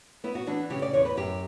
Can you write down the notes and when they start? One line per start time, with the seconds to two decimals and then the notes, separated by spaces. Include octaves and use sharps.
0.24 B3 E4
0.35 F#4
0.47 E3 D4
0.70 C#3 G4
0.82 D5
0.93 E2 C#5
1.05 B4
1.17 F#2 G4